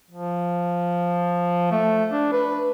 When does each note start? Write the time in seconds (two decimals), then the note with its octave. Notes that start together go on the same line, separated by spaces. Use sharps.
0.10 F3
1.71 A3
2.12 D4
2.32 B4